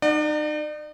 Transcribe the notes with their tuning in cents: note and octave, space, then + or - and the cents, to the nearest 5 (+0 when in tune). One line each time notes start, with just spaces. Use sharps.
D#4 -30 D5 +40 F#5 -10